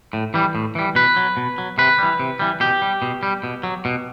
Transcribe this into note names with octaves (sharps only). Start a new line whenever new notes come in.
A2
E3 G3
A2
E3 G3
B2 B4
F#3
B2
F#3
C3 B4
E3 G3
C3
E3 G3
B2 G4
G3
B2
G3
B2
F#3
B2